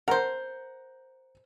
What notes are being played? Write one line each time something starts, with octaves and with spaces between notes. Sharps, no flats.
A#4 C5 F#5 A#5